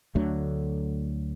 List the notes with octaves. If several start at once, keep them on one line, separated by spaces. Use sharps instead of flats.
D2 D3 F#3 A3